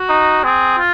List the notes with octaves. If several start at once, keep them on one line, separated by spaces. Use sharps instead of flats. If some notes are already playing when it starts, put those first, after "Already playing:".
Already playing: F#4
D#4
C4 G#4
F4